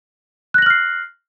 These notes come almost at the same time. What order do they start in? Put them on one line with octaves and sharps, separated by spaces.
F#6 A#6 F#7 F6 C7